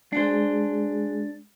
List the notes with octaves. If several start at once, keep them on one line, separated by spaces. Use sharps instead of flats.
G#3 D4 F#4 G#4 C5